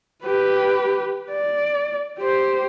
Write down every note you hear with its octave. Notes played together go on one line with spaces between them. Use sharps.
G4 B4
D5
G4 C5